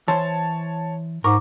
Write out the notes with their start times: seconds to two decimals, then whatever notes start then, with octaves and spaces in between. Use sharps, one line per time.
0.08 E3 C5 C#5 A5
1.24 G#2 A#4 C#6 D6